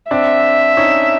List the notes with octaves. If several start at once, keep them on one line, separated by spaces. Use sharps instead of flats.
C4 D4 E5
C#4 D#4